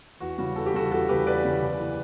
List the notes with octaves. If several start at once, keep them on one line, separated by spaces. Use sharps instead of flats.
E2 F#4
C#3 G3 F#4
E2 A4
G4
C#3 G3 F#4 A4
E2 F#4 A4
C#3 G3 G4 B4
E2 B4 D5
C#3 G3
F#1
E3